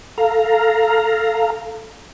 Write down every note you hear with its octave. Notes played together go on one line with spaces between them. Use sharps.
A4 F5 A#5